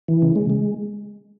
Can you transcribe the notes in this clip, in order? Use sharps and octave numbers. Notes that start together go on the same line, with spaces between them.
E3
C#3
G#3
G#3